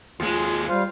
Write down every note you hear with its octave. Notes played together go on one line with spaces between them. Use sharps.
D#2 G#3 F4
G3 C5 F5